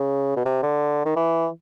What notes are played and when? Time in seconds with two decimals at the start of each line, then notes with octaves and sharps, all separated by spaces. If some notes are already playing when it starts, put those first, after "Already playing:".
Already playing: C#3
0.36 B2
0.46 C3
0.63 D3
1.05 D#3
1.16 E3